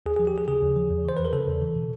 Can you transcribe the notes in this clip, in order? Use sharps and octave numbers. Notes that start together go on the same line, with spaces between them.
D#2 G#4
G#4
F3
G4
D#2 G#4
C#3 G#4
D#2
F3
E2
E3 C5
E2 B4
A#4
C#3 A4
E2
E3
B2